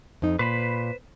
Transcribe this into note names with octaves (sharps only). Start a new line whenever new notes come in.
F2 D#4
A#2 B4 C5 B5